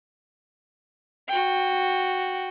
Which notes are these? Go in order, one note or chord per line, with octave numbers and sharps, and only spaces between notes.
F#4 G5